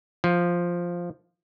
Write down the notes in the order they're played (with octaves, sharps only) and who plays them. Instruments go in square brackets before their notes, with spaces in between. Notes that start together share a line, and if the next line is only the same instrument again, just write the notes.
[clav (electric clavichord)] F3